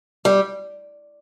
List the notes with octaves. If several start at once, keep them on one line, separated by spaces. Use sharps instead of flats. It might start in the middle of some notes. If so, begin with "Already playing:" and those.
G3